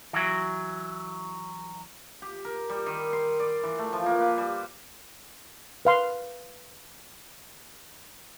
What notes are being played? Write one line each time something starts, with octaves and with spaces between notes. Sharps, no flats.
E3 F#3
G4
A#4
G3
D#3
C6
D5
E3
A3
F3
A#3
B4
G3
B4 F5 C6